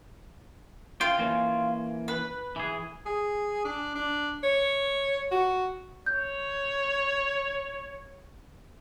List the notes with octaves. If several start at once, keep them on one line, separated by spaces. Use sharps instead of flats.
F4 G5
E3 A#3 C#4
B4
E3 G#4
G#4
D4
D4
C#5
F#4
C#5 G6